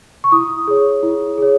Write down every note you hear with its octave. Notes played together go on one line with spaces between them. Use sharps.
C#6
E4 D#6
G#4 C#5
E4
G#4 C#5